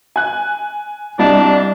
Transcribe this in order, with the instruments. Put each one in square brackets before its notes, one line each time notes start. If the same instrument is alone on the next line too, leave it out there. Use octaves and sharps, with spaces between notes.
[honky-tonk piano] G#5 F#6
[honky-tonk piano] C2 D#5 E7 [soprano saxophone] D4